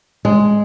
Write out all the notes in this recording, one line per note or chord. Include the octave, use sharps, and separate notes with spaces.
G#3